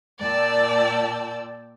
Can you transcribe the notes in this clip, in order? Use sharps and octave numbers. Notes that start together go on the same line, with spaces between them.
A#2 D5 G5 A5 E6